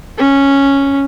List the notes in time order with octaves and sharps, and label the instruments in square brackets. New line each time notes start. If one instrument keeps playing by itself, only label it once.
[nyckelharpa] C#4